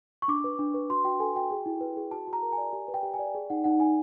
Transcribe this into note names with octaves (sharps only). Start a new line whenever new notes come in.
C#6
D4 D6
B4
D4
B4
F#4 C6
F#4 G5
A4 G#5
F#4 G5
G#4
E4
B4
G#4
F#4 A5
F#4
A#5
A#4
G#5
D5
G4 G#5
B4
G5
G4
G#5
D5
G#4
D#4 F#5
D#4 F#5
D#4 G#5